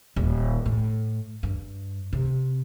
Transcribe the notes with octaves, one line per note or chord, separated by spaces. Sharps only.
D#1
A2
G2
C3